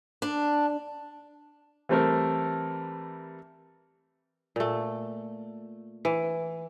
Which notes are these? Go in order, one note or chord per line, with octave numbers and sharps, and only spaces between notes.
D4
E3 G3 A3 C4 A4 A#4
A#2 A3
E3